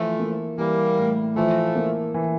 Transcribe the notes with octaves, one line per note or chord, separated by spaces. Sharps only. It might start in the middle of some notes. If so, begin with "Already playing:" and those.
Already playing: E3 F3 A3
A#3
E3 G3 A#3
A2
E3 F3 A3
A#3
E3